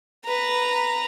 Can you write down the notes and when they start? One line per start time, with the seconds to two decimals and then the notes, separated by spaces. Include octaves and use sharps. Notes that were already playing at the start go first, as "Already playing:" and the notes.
0.25 B4 A#5